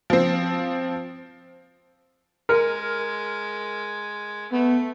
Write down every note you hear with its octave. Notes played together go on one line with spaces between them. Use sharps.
F3 C4
G#3 A#4
A3 B3